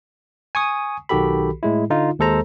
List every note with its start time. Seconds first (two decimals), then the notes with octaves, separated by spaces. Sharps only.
0.55 G#5 C#6 D#6
1.09 B1 D#3 F#4 G4 A4 B5
1.63 A2 G#3 E4
1.90 D3 D#4 F4
2.19 D#2 G#3 A4 C5 A#5